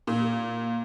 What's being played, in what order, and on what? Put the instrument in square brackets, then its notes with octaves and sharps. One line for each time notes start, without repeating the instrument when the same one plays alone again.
[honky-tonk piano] A#2